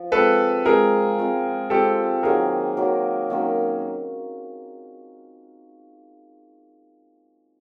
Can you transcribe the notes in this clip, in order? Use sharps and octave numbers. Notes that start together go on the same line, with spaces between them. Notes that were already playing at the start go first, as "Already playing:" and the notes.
Already playing: F3
G#3 C4 F4 A4 B4
G#3 C4 F4 G#4 A#4
G#3 C4 F4
G#3 C4 F4 G4 A4
D#3 F#3 A#3 G#4 A#4
D#3 F#3 A#3
D#3 F#3 A#3 C#4